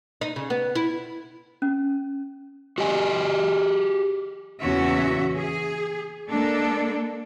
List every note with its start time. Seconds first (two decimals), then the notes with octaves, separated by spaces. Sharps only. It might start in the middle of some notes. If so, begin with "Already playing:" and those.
0.21 D#4
0.36 C#3
0.50 B3
0.76 E4
1.62 C#4
2.78 F#4 G4 D#5 G#5
4.62 E2 A#2 C#3 C#4 F#4 E5
5.38 G#4
6.28 G#3 A#3 D4 A4